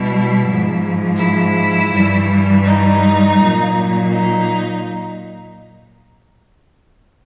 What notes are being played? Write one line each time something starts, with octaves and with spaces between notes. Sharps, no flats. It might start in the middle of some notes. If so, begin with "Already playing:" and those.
Already playing: B2 G3 E4
G#2 F3
E4
G2 E3 G3
D#4
A#2 F#3
D#4